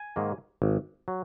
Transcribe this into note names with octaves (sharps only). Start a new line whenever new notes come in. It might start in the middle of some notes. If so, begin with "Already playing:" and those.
Already playing: G#5
G#2 D#3 A#3
G#1
F#3